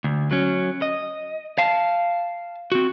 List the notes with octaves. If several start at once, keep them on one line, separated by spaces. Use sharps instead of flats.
D2
F#3 C#4
D#5
F5 A5
C4 F#4